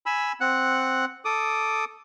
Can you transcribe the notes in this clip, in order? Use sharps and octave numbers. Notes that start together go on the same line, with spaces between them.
G#5 B5 E6
C4 F#5 F#6
A4 D6 D#6